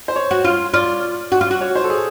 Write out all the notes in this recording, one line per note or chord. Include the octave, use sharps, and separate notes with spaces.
C5
C#5
F#4
F4
F4 D5
F#4
F4
F#4
C#5
C5
A4
G#4